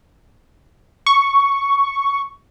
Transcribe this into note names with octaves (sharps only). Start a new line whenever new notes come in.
C#6